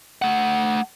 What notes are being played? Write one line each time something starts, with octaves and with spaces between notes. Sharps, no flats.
A3 F#5